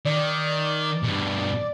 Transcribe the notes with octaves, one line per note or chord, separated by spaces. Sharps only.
D#3 D5
G2 B2